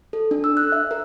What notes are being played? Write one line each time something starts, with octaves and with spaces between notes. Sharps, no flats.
A4
D4
E6
F#6
E5
A#4